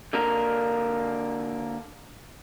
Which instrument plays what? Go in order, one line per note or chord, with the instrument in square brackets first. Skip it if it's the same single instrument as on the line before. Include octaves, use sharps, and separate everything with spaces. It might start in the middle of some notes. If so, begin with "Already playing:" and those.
[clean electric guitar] D3 A#3 D4 A#4